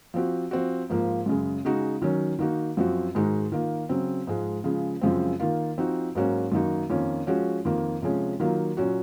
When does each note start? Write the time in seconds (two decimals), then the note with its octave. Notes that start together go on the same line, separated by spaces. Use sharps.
0.14 F3 C4 F#4
0.51 F3 C4 F#4
0.90 G#2 F3 A#3
1.26 F#2 C#3 G#3
1.65 C#3 G#3 D#4 F#4
2.02 D#3 F#3 C#4
2.39 D#3 A#3 D#4 F#4
2.77 F#2 F3 C4 F#4
3.15 G#2 D#3 G#3 D#4 F#4
3.52 D#3 A#3 F4
3.89 C#3 F#3 C4
4.27 G#2 F3 G#3
4.64 C#3 F3 G#3
5.01 F#2 C#3 F3 G#3 C4
5.40 D#3 A#3 F4
5.78 F3 C4 D#4 F#4
6.15 G#2 F#3 A#3 C#4 F#4
6.52 F#2 D#3 A#3 D#4 F#4
6.90 F2 D#3 A#3 C#4
7.27 F3 G#3 C#4 F#4
7.65 F2 D#3 A#3
8.02 C3 F3 G#3 C#4
8.40 D#3 F#3 A#3 F4
8.77 A#2 F#3 C#4 F#4